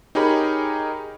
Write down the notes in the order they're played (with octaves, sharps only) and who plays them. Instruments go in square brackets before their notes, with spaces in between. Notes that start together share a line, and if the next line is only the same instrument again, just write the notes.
[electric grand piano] D#4 G4 G#4 A#4 C#5 B5